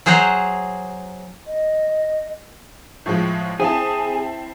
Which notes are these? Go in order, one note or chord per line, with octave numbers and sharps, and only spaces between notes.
F#3 G#4 C5 F#5 A#5
D#5
A2 F3 G#3
C4 E4 G#4 A5